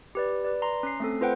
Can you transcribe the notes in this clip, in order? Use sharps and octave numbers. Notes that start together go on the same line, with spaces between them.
G4 B4 D5
B4 D5
A#5 C6
C#4 C7
A3 C4 A4
F4 B4 C5 F#5 G5